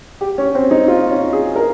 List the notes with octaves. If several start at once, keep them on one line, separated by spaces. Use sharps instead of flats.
G4
C#4
C4
D#4
F4
C#4
G#4
A#4